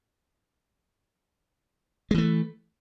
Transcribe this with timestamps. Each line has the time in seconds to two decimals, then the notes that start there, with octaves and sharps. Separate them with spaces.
2.11 G#3
2.14 E3
2.18 A3